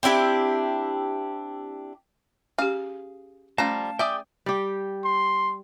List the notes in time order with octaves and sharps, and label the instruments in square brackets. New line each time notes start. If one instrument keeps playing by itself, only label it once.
[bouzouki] C4 D4 E4 G4
[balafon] C#4 G4 [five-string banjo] G#4 F5
[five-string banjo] F3 G3 A#5 [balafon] A3 C#4 [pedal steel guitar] F5 A5
[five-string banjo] G#4 D5 E5 [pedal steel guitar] G5 D6 D#6
[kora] G3 G4
[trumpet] C6